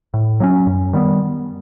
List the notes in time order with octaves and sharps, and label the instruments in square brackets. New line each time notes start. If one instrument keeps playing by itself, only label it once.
[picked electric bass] A2
F#3 A#3 C#4
F#2
D#3 G3 B3